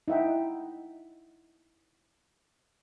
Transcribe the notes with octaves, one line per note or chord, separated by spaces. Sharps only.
D#4 E4 E5 F#5 G5